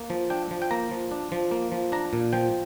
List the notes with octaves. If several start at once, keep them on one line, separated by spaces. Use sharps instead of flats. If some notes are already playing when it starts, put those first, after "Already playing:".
Already playing: A#3
F3
D4 G5
F3
G5
A#3 A#5
F3
D4
F3
A#3
F3
D4 A#5
A#2
F3 G5